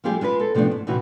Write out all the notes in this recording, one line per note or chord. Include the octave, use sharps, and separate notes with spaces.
F3 G3 A3 F4 G4 G#4
G#3 F4 A4 B4
C4 A4
C3 F3 A3 B3 D4
G#2
A2 C3 E3 F#4